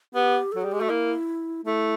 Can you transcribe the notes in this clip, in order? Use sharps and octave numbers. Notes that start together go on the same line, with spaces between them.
B3 G4
F#3 A4
G3 G#4
G#3 G4
A3 F#4
A#3 E4
A3 E4